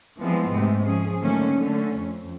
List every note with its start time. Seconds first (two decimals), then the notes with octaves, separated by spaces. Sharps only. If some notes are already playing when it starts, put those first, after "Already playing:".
0.20 E3 F3 G3 G#3 B3 C4
0.53 G#2 C3 G#3 A3
0.85 F3 C#4 G#4
1.21 D3 D#3 F#3 A3 A#3 C#4
1.57 D3 A3 C#4
2.00 F2